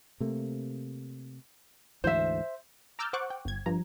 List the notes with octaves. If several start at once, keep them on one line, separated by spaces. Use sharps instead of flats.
C3 A3 A#3
D2 G#2 E3 C5 E5
A#5 D6 E6 F6 G6 A6
C5 F#5 C#6 D6 F#6
G5
G1 G#6
G2 F3 A#5